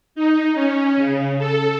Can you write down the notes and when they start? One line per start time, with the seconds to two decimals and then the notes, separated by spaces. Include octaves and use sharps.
0.15 D#4
0.54 C#4
0.97 C#3
1.38 A4